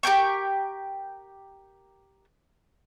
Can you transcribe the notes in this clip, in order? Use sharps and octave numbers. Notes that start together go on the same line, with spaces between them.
G4 A#4 G5 C#6